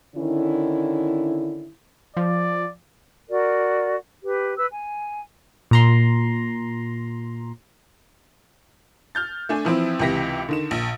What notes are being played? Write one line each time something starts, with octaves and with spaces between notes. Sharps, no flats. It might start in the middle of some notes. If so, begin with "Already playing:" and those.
D3 D#3 C#4 E4
F3 D5
F#4 A#4 D5
G4 B4
B4 E6
G#5
A#2 A#5 C6
F6 G6 A6
A3 D4 G#5
E3 F3 C4 E4
C#2 C3 E3 G4 A#6 B6
D3 D#3 E7
A#1